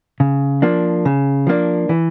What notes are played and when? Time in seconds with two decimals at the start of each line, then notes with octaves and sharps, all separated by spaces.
0.20 C#3
0.62 F3 A#3 D4
1.05 C#3
1.47 F3 A#3 D4
1.89 E3